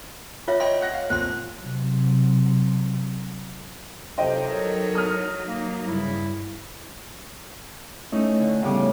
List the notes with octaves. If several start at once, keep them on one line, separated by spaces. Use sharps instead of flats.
F4 C#5 E5
C#5 D#5 G5 C6
F#5 F#6 A#6
F5
F2 A#2 C5 C6
C3 F#3
F2 C3 F#3 D#4 C5 D#5 G5
A4 A#4 C#5
D#6 F6
A#3
G2 C#3 E4
A3 C#4 D#4 E4
D3 G#5
A2 C#3 E3 G3 B3 D6